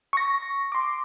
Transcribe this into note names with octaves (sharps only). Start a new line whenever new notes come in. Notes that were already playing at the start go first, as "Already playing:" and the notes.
C#6 A#6
C6 D6